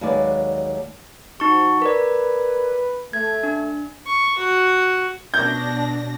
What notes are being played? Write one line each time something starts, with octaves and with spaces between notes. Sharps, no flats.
D#2 F#3 G#3 B4 D5
F3 D#4 F#4 C#6
A#4 B4 D5
A3 G#6
D4
C#6
F#4
B2 D4 G6 A#6